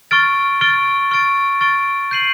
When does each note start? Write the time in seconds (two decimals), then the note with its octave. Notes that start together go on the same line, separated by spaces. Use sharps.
0.11 C#6 F6 A6 D7
0.61 C#6 F6 A6 D7
1.11 C#6 F6 A6 D7
1.61 C#6 F6 A6 D7
2.11 G6 C7 D#7 F#7